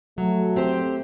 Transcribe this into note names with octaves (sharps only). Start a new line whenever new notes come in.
F#3 A3
C4 G4 C5